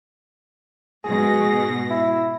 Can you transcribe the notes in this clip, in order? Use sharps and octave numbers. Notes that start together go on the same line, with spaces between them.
G#2 B2 G#4 A#6
E4